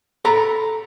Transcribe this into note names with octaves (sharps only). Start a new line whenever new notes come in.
A4 A#5 B5